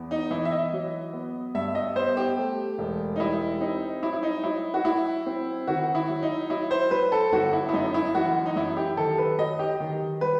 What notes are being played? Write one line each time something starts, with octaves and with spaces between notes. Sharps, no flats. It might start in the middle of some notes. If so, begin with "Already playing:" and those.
Already playing: E2 B3
D#4
E3 E4
E5
D#5
F#3
B3
G2 E5
D#5
B3 C5
G4
A3
E1
D#4
G3 E4
C4 D#4
F#3 E4
E4
D#4
F#3 E4
F#4
F#3 E4
C4
D#3 F#4
E4
F#3
D#4
F#3 E4
C5
F#3 B4
A4
G1 F#4
E4
E4
F#2 D#4
E4
E3 F#4
D#4
F#2 E4
G4
D#3 A4
B4
F#3 D#5
G4
D#3
G3 B4